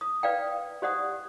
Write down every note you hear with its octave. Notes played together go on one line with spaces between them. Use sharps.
D#6
B4 D5 F5 G5
G4 C5 D5 F#5 D#6